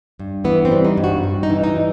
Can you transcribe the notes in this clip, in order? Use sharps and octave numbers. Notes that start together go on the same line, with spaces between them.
G2
E3 B3
C4
G3
D#4
G2
F#4
G2
D#4
E3
D#4
G3